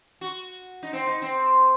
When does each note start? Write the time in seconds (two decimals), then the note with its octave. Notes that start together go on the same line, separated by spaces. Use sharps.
0.21 F#4
0.83 D#4
0.93 C4
1.07 D#4
1.22 C4